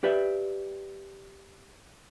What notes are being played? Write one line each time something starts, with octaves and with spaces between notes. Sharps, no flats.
G4 B4 D5 E5